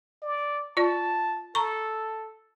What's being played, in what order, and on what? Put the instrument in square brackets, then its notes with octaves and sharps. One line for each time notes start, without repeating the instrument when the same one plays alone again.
[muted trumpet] D5
[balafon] F4 D5 [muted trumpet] A5
[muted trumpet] A4 [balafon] A#5 C#6